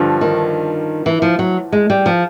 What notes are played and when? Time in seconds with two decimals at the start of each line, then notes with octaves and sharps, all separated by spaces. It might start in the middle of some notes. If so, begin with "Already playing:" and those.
Already playing: G2 D3 F3
0.21 D#3
1.06 E3
1.22 F3
1.39 F#3
1.72 G#3
1.90 G3
2.06 F3